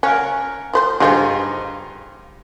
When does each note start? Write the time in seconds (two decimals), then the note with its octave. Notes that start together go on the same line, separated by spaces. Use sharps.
0.03 C#4 A#4 F5 F#5
0.73 F3 B4 C5
1.00 G2 D3 D#4 F4 G#4 C5